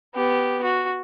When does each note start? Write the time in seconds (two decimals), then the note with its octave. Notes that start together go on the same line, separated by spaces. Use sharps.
0.15 B3 G4
0.63 F#4